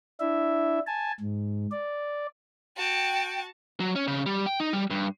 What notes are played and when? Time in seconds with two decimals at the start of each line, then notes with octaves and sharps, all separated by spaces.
0.20 D4 E4 E5
0.87 G#5 A5
1.20 G#2
1.71 D5
2.77 F#4 G5 A5
3.80 F#3
3.96 C#4
4.07 C#3
4.26 G3
4.46 G5
4.60 D#4
4.73 G3
4.90 G2